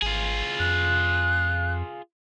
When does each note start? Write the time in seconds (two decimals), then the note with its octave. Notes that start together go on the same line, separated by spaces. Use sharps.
0.02 G#1 F4 G#4
0.60 F2 F#6